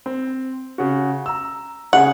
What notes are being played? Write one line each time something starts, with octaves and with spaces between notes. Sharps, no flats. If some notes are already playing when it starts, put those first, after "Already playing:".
C4
C#3 F#4
A#5 E6
C#3 G#4 F#5